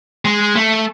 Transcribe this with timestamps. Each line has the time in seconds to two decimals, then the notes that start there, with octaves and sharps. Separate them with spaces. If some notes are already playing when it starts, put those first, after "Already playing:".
0.25 G#3
0.56 A3